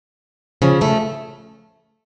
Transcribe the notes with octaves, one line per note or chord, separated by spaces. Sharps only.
C#3 F3
F3 A3